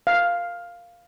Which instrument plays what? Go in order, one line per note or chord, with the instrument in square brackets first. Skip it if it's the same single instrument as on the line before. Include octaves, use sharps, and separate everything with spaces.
[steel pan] F5